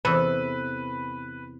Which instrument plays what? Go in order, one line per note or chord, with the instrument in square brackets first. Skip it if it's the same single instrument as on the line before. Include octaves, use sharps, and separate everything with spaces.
[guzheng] E2 C3 A4 [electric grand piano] B4